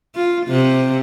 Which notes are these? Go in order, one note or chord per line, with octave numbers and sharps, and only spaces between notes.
F4
C3